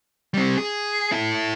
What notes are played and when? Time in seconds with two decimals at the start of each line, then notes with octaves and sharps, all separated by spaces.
0.34 G3 C4
0.57 G#4
1.12 E4 A4